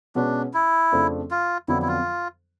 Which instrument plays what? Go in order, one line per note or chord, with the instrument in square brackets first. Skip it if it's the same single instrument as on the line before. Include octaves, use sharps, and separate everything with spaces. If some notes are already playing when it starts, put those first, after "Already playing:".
[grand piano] B2 G#3 C#4 F#4 B4 [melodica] D4
[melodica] E4
[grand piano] F2 C#3 F3 A3 D4
[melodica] F4
[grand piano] F2 D3 F#3 B3 D4 [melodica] E4
[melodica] E4
F4